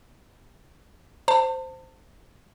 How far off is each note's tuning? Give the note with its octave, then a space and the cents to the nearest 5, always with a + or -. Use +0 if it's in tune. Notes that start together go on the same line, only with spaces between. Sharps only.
C5 -10 A5 +35